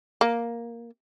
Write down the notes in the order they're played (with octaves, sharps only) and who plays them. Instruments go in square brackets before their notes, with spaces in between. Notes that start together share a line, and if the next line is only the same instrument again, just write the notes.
[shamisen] A#3